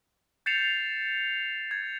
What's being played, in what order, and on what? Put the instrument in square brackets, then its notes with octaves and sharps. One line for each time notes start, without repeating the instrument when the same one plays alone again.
[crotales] G6 A6 C7 C#7 E7 F7
G#6